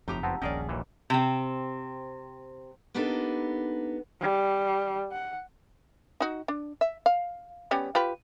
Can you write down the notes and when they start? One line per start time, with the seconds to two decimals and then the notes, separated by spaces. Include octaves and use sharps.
0.08 F#1 F2 A2 D#4 G4 A#5
0.23 B3 C4 F#5 A5 E6
0.42 D#1 A#1 C#4 G#4 A#4 D5 D#5 G5
0.69 D#2 A#2 E3
1.10 C3 C4
2.94 A#3 B3 D4 D#4 G4 A4
4.20 G3
5.12 F#5
6.20 D#4 F#4
6.48 D4
6.81 E5
7.06 F5
7.71 G3 B3 C#4
7.95 F4 G4 B4